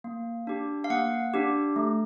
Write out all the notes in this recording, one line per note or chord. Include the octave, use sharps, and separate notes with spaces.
A#3
D4 G4
F5
A#3 F#5
D4 G4
A3